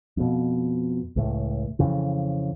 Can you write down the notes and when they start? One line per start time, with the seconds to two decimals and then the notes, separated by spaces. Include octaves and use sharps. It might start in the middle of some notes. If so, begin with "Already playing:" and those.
0.17 F2 B2
1.16 C#2 A2
1.79 F2 C#3 E3